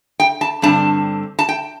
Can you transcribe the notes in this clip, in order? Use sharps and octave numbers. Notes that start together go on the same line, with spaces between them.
G5
A5
G2 D3 C4 A5
A5
G5